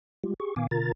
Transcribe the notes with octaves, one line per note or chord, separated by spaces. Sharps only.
G3 G#3 F4 G4
G4 G#4 C#6
A#2 D#3 B3 F5 G#5 D6
B2 D3 F4 A#4 A#5 A6